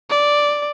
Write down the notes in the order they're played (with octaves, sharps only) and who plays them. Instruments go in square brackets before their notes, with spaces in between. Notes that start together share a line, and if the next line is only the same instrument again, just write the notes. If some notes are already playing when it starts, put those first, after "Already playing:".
[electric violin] D5